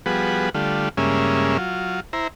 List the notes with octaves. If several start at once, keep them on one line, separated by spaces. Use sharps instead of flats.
F3 G3 B3 F#4 G#4 B4
D3 G3 A3 F4
G2 C#3 G#3 A#3 C#4 E5
F#3 F4
E4 C5 A#5